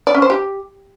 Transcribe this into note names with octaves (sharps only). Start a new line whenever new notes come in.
D5
C#4
C5
G4